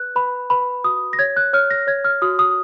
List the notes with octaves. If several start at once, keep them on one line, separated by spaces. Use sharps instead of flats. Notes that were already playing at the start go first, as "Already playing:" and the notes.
Already playing: B4 F#6
B4 B5
B4 B5
F#4 D#6
A#6
C#5 G#6
F#6
C#5 F6
A#6
C#5 G#6
F6
F#4 D#6
D#6